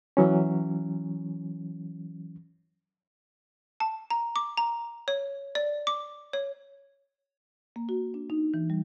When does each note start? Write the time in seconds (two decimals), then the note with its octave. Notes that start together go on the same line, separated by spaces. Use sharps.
0.17 E3 F#3 C#4
3.80 A5
4.10 A#5
4.36 D6
4.57 A#5
5.08 C#5
5.55 D5
5.87 D6
6.33 C#5
7.76 A#3
7.89 F#4
8.14 D4
8.30 D#4
8.54 E3
8.70 G3